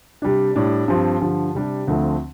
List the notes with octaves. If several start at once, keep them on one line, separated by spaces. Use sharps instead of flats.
C3 G3 D4
A2 G3 D4
G2 F3 C4
G2 D3 F3
C3 G3 D4
D2 D3 F3 A3 C4